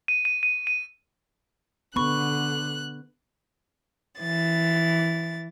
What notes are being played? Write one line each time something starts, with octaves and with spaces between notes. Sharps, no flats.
D#7
D#7
D#7
D#7
D3 B3 B5 C#6 F#6
E3 A6